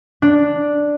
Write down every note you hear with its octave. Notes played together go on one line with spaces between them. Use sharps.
D4